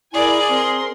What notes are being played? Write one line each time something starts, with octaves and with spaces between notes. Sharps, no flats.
E4 G#4 A#4 D5 G#5
C4 A#4 C6